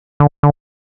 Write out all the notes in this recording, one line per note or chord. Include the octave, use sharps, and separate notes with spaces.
D3
D3